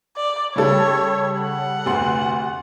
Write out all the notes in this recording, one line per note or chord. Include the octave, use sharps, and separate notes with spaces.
D5
C#3 G3 A4 C#5
F#5
F1 D2 C6